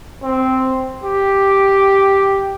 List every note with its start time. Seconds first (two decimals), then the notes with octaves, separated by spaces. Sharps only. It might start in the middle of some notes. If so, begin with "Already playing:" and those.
0.23 C4
1.04 G4